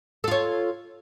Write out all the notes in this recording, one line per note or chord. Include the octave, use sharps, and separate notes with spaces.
F4 A4 C#5